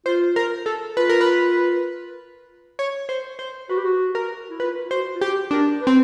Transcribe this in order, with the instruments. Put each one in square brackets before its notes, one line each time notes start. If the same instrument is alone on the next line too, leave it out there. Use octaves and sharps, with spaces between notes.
[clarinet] F4 [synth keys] C5
[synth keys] A#4
A4
[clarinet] F4 [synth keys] B4
[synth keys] A#4
B4
C#5
C5
C5
[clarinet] F#4 [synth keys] B4
[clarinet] G4
F#4
[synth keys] A#4
[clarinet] E4
[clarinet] F4 [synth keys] B4
[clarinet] F4
[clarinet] F#4 [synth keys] C5
[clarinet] F4
[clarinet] F#4 [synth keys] G4
[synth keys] D4 [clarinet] A#4
[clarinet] B4
[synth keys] C4